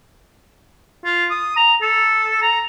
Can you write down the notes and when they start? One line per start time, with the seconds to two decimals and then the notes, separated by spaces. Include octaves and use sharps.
1.05 F4
1.31 D#6
1.56 A#5
1.82 A4
2.42 A#5